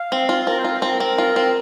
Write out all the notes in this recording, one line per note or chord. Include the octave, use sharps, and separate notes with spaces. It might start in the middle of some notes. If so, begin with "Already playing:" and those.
Already playing: F5
C4
F4
C4 A#4
C5
F4
A#4
C4
C4
F4
C4